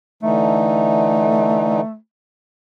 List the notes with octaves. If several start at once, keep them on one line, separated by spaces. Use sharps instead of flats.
D3 E3 A3 D#4